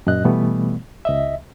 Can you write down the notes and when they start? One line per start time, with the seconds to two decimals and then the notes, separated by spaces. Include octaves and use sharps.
0.07 F#2 A#2 D#5 F#6
0.24 B2 E3 G3 A3 B3
1.05 C#2 D#5 E5